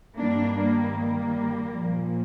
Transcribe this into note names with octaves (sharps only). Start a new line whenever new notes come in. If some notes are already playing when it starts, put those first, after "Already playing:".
G2 D#3 G3 A#3 D4
G3 A#3
G3 A#3
A#2 F3